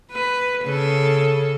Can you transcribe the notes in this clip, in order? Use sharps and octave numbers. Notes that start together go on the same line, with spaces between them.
B4
C#3 A4